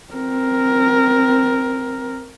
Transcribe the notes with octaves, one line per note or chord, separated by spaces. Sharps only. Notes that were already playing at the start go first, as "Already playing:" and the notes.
C4 A#4